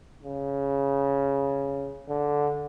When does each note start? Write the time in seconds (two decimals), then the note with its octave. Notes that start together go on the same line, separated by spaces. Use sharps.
0.24 C#3
2.08 D3